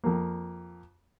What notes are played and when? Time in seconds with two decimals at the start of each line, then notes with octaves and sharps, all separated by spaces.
0.04 F2 A#3